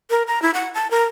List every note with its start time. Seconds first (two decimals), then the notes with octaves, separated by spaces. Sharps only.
0.10 A#4
0.27 A#5
0.42 E4
0.54 F#5
0.75 A5
0.91 A#4